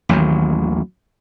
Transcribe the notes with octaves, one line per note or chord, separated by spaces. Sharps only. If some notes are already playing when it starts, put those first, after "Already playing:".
A1 D#2 D#3 F#3